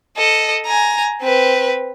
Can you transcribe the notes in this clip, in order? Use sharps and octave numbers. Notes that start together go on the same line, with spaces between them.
A4 D#5
G#5 A#5
C4 B4